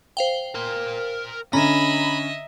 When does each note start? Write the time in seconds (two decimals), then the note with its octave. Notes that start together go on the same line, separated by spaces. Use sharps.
0.17 C5 F5 G5
0.55 A#4 C6
1.53 D3 C#4 D#5 E5 A#5 B5